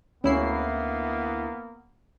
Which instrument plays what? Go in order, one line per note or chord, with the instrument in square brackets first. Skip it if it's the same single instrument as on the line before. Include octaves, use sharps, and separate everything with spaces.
[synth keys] D2 E4 C7 [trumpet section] A#3 B3 [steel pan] C#4